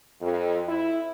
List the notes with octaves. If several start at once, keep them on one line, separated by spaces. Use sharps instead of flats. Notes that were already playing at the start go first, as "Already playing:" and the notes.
F2
E4